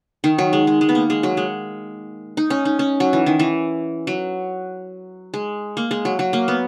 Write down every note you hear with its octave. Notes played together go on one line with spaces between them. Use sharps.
D#3
F#3
G#3
G#3
G#3
B3
A#3
G#3
F#3
G#3
D#4
C#4
D#4
C#4
F#3
E3
D#3
E3
F#3
G#3
A#3
G#3
F#3
F#3
A#3
B3